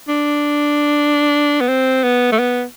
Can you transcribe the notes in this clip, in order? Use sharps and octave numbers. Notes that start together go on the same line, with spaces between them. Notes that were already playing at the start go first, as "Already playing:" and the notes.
D4
B3
C4
B3
A3
B3